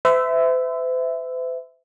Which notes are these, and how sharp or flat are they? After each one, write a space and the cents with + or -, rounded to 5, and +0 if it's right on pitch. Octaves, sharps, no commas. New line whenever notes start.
C5 -45 E5 +0